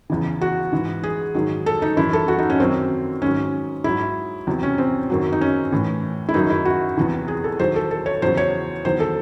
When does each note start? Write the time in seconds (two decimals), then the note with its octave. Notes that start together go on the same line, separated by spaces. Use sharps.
0.10 E2 C#3 E3
0.41 F#4
0.72 G#2 E3
1.03 G#4
1.34 G#2 D#3 F#3
1.66 A4
1.82 D#4
1.97 F#2 E3 E4
2.13 A4
2.28 F#4
2.39 D#4
2.50 C#4
2.60 F#2 D#3 F#3 C4
3.22 G#2 D#3 F#3 C#4
3.84 G#2 F#3 E4
4.47 E2 C3 F#3
4.63 C#4
4.78 C4
5.10 F#2 D#3 F#3
5.33 D#4
5.41 C#4
5.72 A2 E3
6.29 E4
6.34 F#2 D#3 F#3 D#4
6.50 E4
6.65 F#4
6.97 E2 C3 E3
7.28 G#4
7.44 A4
7.59 E2 D#3 F#3 C5
7.76 A4
7.91 A4
8.06 C#5
8.22 E2 C#3 F#3 C5
8.37 C#5
8.85 E2 D#3 F#3 C5
9.00 A4